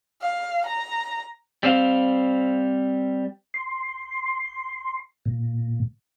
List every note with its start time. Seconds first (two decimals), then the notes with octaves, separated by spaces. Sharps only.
0.22 F5
0.66 A#5
1.63 G3 C4 C5 F5
3.54 C6
5.25 A#2